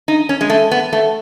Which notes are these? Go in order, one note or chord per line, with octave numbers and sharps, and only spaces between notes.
D#4
C#4
G#3
A3
B3
A3